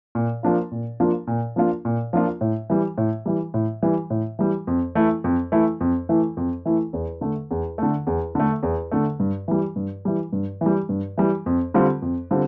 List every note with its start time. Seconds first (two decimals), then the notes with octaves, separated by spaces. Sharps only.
0.15 A#2
0.43 F3 A#3 D4 F4
0.72 A#2
1.00 F3 A#3 D4 F4
1.27 A#2
1.56 F3 A#3 D4 F4
1.85 A#2
2.13 F3 A#3 D4 F4
2.41 A2
2.70 E3 G3
2.98 A2
3.26 E3 G3
3.54 A2
3.83 E3 G3
4.10 A2
4.39 E3 G3
4.67 F2
4.95 E3 A3 E4
5.24 F2
5.52 E3 A3 E4
5.81 F2
6.09 E3 A3 E4
6.37 F2
6.66 E3 A3 E4
6.93 E2
7.21 D3 A3
7.51 E2
7.78 D3 A3
8.07 E2
8.35 D3 A3
8.63 E2
8.92 D3 A3
9.20 G2
9.48 E3 G3
9.76 G2
10.05 E3 G3
10.33 G2
10.61 E3 G3
10.89 G2
11.18 E3 G3
11.46 F2
11.74 D3 G3 C4 F4
12.02 F2
12.31 D3 G3 C4 F4